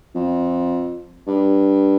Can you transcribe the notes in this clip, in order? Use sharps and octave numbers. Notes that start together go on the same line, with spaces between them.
F2
G2